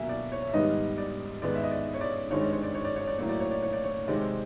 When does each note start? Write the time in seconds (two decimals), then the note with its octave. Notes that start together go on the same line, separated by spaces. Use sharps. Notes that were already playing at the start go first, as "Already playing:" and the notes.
Already playing: B2 F#3 A#3 E5 G#5
0.09 D5
0.32 C#5
0.48 E5
0.54 G#2 D#3 G3 B3 D#5
0.98 D5
1.42 G#2 D#3 G#3 B3 D5
1.55 E5
1.63 D#5
1.71 D5
1.94 C#5
2.01 D5
2.30 G2 D#3 G#3 C4 C#5
2.41 D5
2.53 C#5
2.63 D5
2.75 C#5
2.85 D5
2.96 C#5
3.07 D5
3.18 A2 F#3 A#3 C#5
3.29 D5
3.40 C#5
3.51 D5
3.62 C#5
3.73 D5
3.84 C#5
4.07 C3 D#3 G#3 C4 D5